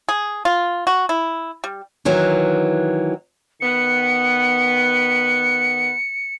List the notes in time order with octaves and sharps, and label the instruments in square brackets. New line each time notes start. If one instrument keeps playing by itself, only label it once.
[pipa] G#4
F4
F#4
E4
G3
[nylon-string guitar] D#3 E3 F#3
[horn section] D#3 B3 [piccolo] C#7